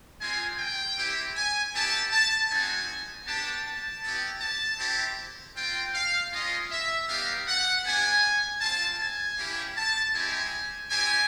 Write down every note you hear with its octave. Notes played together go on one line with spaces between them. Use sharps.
G#3 C4 F4 G#5
G5
C4 E4 G4
G#5
B3 E4 G4 A5
A5
A3 C4 D#4 F#4 G#5
B3 D4 G4 A5
A5
B3 E4 G4
A5
C4 E4 G4
C4 F4 G5
F5
G#3 C#4 F4 D#5
E5
G3 B3 D#4 G4 F5
F#5
B3 D4 G4 G#5
C4 F4 A5
G#5
A#3 C#4 E4 G4
A5
G#3 C4 E4 G4 G#5
C4 E4 G4 G#5